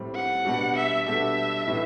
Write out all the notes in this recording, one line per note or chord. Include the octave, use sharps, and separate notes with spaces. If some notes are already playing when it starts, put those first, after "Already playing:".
Already playing: A2 G3 C4
F#5
B2 G3 D4 F#4
E5
B2 G3 D4 F#4 A4 E5
A2 E3 B3 E4